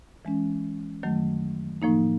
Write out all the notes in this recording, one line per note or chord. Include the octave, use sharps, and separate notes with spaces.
E3 G#3 C#4
F#2 D#3 F#3 A3
A2 F3 A#3 D#4